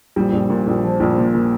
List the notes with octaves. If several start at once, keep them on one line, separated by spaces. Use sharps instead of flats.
A#1 G3
A#1
A#2
A#1
F3
A#1
A#2
A#2